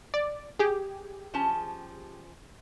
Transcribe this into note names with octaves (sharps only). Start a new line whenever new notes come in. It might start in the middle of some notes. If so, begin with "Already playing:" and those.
D5
G4 G#4
F3 C#4 A5